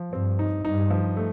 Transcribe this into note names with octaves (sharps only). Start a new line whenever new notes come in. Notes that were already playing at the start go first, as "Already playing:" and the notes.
Already playing: F3
G2 C4
D#4
G2 D#4
F3
A3